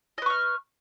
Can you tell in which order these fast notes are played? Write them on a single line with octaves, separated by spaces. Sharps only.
D#5 B4 C#6 F6